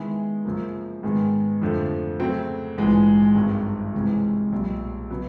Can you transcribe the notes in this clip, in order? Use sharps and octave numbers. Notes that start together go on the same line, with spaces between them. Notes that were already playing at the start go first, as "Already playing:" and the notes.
Already playing: D#3 G#3 B3 E4
F#2 C#3 F3 A#3
G#2 D#3 G#3 B3
F2 D3 F3 A3
C#3 F#3 A3 C4
A#1 G#2 E3 G#3
G#1 G2 D#3
C#2 C3 E3 G#3 C#4
B1 A#2 G3
C#3 F#3 B3